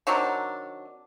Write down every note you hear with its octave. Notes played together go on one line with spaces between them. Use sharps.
D#3 F#3 C4 D4